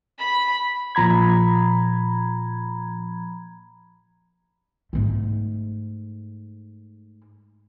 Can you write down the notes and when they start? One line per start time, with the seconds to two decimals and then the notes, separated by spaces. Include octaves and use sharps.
0.19 B5
0.95 A#2 F3 A#5 B5 G#6
4.93 G#2 A3